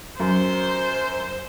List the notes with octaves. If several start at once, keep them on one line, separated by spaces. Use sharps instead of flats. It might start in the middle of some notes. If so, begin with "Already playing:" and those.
F#2 C5